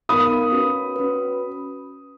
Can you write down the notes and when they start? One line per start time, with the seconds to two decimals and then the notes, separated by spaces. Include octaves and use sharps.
0.09 B3 D#4 A#4 F5 B5 D#6
0.52 C#4 F#4 B4
0.96 C#4 F#4 B4